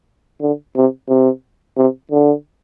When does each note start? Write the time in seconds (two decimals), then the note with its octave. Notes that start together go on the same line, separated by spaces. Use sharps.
0.41 D3
0.76 C3
1.09 C3
1.77 C3
2.12 D3